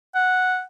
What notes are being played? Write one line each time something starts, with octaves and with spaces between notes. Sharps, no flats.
F#5